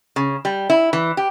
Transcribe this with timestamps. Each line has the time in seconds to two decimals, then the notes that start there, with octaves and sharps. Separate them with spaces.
0.16 C#3
0.45 G3
0.70 E4
0.93 E3
1.17 G4